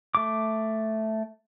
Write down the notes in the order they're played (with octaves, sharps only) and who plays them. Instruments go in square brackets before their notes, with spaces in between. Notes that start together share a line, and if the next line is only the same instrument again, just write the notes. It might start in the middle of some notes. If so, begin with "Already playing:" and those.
[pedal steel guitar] A3 D6